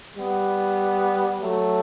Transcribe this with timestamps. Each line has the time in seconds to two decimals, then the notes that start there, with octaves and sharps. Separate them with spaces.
0.17 G3 B3
1.39 F#3 A3